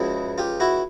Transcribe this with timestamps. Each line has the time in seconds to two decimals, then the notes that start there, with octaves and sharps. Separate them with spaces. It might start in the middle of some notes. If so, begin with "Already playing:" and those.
Already playing: C#2 C#3 F3 G#3 E4 F#4
0.38 F4 G4
0.60 E4 F#4